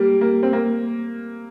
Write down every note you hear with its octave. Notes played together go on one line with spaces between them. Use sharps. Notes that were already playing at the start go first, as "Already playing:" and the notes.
Already playing: G3 A#3
A#3
C4
A#3